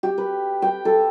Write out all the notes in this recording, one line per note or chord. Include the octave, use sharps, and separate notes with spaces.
G4
B4
G5
A4